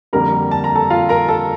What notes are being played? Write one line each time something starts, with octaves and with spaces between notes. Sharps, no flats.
F2 D3 G3 A#3 A#4 A#5
A5
A#5
A4 A5
F4 F5
A#4 A#5
A4 A5